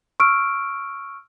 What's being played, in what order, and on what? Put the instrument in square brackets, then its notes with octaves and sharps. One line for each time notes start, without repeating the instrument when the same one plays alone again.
[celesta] C#6 E6 F6 D7